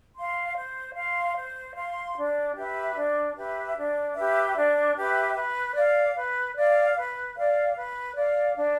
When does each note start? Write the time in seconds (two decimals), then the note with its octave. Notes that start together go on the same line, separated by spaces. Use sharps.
0.16 F5 C6
0.56 C5
0.95 F5 C6
1.36 C5
1.75 F5 C6
2.16 D4
2.55 G4 B4 E5
2.96 D4
3.36 G4 B4 E5
3.76 D4
4.16 G4 B4 E5
4.56 D4
4.96 G4 B4 E5
5.36 B4
5.75 D5 F5
6.16 B4
6.56 D5 F5
6.96 B4
7.36 D5 F5
7.76 B4
8.15 D5 F5
8.56 D4